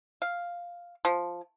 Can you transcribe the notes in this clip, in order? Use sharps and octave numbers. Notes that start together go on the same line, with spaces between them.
F5
F3